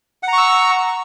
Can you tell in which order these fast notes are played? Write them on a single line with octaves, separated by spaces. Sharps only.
F#5 A#5 C#6 E6